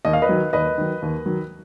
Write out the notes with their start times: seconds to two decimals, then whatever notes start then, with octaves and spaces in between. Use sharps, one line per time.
0.05 D#2 D#5
0.13 F5
0.22 B4 D#5
0.29 D#3 F#3
0.53 D#2 B4 D#5
0.78 D#3 F#3
1.02 D#2
1.26 D#3 F#3